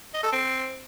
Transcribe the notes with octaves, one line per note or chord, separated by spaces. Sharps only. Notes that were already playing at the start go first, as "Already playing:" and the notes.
D#5
A4
C4